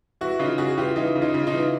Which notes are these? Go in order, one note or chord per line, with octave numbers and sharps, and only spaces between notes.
E3 E4 F#4
C#3 D#4 F4
C#3 F#4 G#4
E3 F4 G4
E3 D#4 F4
C#3
D#4 F4
C#3
D#4 F4
E3